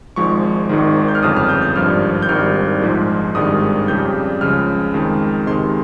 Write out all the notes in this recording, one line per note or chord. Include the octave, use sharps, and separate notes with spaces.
G#1 G#2 F3 G#3 C#6
G#1 G#2 D#3
G6
F6
G1 F2 C#3 D#6
F6
G6
G6
G#1 G2 F3 F6
G6
G#1 G2 D#3 G3 F6
A#1 G#2 F3 G#3
G#1 G2 D#3 G#3 D#6
F2 C#3 G3 G6
C#2 C#3 F3 F6
F2 D#3 G#3
C#2 C3 D#3 G#3 C6